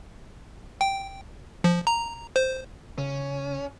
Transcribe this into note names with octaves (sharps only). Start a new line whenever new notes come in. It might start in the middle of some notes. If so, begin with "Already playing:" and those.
G5
F3
A#5
C5
C#3 C#4